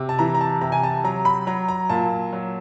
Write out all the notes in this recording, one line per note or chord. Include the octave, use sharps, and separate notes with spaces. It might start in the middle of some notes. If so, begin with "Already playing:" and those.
Already playing: C3
A5
E3 A#5
A#5
A5
C3 A#5
G#5
A5
F#3 A#5
B5
F#3 A#5
A#5
A#2 A5
F#3